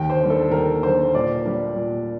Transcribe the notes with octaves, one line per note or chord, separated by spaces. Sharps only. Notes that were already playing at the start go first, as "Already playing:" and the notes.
Already playing: D#2 G5
C5
D3 G3
A4
D#2 A#4
D3 G3 C5
A#2 D5
G3 D4
A#2